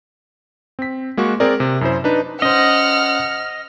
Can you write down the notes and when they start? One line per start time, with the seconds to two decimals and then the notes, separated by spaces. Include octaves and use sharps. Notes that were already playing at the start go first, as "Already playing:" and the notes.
0.79 C4 B6
1.17 G#3 A#3 F#4 C#6
1.40 C4 G#4 A#4 D5
1.60 C3
1.81 F#2 E4 C5
2.04 D4 D#4 B4
2.42 C#4 C5 D#5 F#5 F6